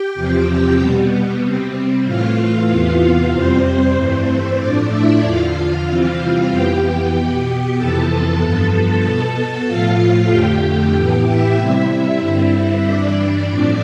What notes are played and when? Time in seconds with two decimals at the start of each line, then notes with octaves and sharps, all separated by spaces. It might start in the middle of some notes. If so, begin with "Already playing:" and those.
Already playing: G4 G5
0.14 E2 C3 F3 C4
0.78 B2 G3 B3
1.42 C3 G3 C4
2.05 A2 E3 A3 F4 F5
2.68 E2 C3 E3 B3
3.32 F2 C3 G3 C4 C5
3.96 G2 E3 A3 C4
4.59 A2 F3 A3 D4 D5
4.90 E4 E5
5.22 E2 D3 F3 F4 F5
5.86 C3 E3 G3 C4
6.49 F2 E3 B3 G4 G5
7.13 B2 B3
7.76 F2 C3 E3 B3 A4 A5
8.08 A4 A5
8.40 G2 F3 B3
9.03 B2 B3
9.67 A2 F3 A3 F4 F5
10.30 F2 D3 A3 G4 G5
10.62 G4 G5
10.93 A2 E3 B3 G4 G5
11.25 E4 E5
11.57 C3 G3 C4 E4 E5
12.21 G2 D3 G3 C4
12.83 G2 E3 G3 D4 D5
13.48 A2 F3 A3 C4